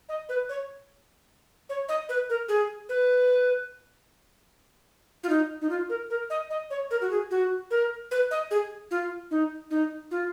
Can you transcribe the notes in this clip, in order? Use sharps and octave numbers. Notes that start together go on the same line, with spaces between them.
D#5
B4
C#5
C#5
D#5
B4
A#4
G#4
B4
F4
D#4
D#4
F4
A#4
A#4
D#5
D#5
C#5
A#4
F#4
G#4
F#4
A#4
B4
D#5
G#4
F4
D#4
D#4
F4